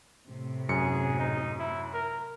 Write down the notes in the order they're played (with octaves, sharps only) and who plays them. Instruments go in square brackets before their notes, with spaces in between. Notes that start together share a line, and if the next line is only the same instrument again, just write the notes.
[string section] A2 C3
[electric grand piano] F#2 C#7 [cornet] G#4
[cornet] D#4
E4
A#4